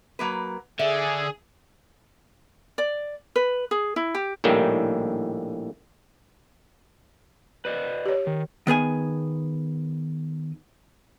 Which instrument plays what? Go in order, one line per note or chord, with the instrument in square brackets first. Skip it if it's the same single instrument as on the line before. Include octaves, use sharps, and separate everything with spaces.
[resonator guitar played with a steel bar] F#3 A#3 B4
[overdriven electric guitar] D3 [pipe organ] G#4 [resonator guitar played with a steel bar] E5
[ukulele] D5
B4
G#4
E4
G4
[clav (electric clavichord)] A#1 A2 D#3 G3 A#3
[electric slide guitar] B4 D5 D#5
[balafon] G4 C#5
[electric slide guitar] D#3
[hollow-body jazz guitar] D#3 B3 G#4 G#5